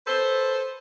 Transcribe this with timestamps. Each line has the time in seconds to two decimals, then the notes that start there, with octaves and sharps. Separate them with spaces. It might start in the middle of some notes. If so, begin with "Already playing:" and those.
0.07 A4 B4 C5